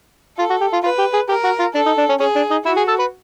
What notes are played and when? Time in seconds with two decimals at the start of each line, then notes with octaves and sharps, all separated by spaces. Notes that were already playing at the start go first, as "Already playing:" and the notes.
0.38 F4 A4
0.50 F#4
0.61 G4
0.73 F4
0.84 F4 B4
0.99 G4
1.14 G#4
1.29 G4 A#4
1.44 F#4
1.60 F4
1.75 D4 A4
1.86 D#4
1.98 D4
2.09 C#4
2.20 C#4 G#4
2.36 D4
2.51 D#4
2.66 E4 F#4
2.77 G#4
2.88 A4
2.99 B4